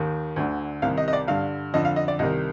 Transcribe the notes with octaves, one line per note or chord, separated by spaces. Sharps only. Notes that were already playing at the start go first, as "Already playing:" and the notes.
Already playing: D#2 D#3
D2 D3
C2 C3 D#3 F5
D#5
D#5
D5
G2 D3 F5
F2 D3 D#5
F5
D#5
D5
C2 C3 D#3 D#5